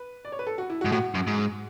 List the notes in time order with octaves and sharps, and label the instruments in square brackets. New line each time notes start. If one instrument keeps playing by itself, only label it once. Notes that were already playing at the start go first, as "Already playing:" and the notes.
Already playing: [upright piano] B4
D5
C#5
B4
A4
F#4
E4
F#4
[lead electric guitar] G#2
[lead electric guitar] A2 [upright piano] F#4
[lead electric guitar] F#2
G#2